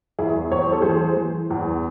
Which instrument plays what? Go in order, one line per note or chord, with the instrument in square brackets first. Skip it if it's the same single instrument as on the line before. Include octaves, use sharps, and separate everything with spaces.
[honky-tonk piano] E2 E4 G#4
E2 C#5
C5
A4
E3 G#4 C5
E3
E2